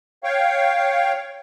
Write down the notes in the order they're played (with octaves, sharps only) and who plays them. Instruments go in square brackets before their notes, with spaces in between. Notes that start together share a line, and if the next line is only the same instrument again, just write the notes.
[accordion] C#5 F5 G5 C#6